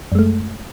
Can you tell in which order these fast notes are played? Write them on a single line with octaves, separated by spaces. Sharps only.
F#2 G#3 A3